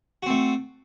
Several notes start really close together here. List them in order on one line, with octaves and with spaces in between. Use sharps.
F#4 C4 A3